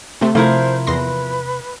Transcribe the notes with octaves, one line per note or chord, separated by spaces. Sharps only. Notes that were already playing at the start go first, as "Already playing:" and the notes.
C3 A3 C6
C3 F3 A3 E4 A#4 C5
E2 B4 C6 A#6